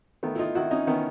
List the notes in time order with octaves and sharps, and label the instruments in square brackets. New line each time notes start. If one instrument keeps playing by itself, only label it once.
[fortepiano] D#3 A3 B3
E4
D#4 F4
D#3 E4 F#4
C#4 D#4
D#3 B3 C#4